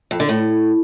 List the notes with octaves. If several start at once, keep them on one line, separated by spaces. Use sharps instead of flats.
F2
D3
A2